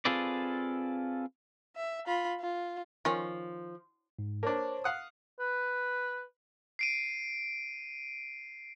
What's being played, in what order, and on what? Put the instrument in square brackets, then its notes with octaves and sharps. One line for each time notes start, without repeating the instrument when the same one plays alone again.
[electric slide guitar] C4 F4 G#4 A4 B4 D5
[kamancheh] E5
F4 B5
F4
[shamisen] D#3 C#4 [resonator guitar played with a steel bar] F3
[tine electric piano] G#2
[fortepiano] A#3 D4 [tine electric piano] C5 C#5 A5
[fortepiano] F5 F#5 D#6
[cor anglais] B4
[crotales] C7 D7 D#7